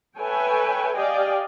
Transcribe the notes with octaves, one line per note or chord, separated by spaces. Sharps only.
A4 B4 C#5 E5 G5 G#5
G4 D5 D#5 F5 G5 G#5